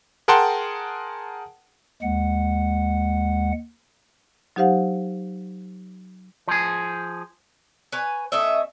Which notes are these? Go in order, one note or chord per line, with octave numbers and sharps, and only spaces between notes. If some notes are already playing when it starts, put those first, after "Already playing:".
G#4 A#4 F#5 G5 A5 C6
D#2 G#3 F#5
F#3 D#4 G4 C5 F5 F#5
F3 G#4
B4 C#5 G#5
A3 C#4 D#5 E5